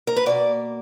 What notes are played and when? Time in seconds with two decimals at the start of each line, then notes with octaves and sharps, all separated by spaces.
0.07 A#4
0.16 B4
0.26 B2 A#3 D5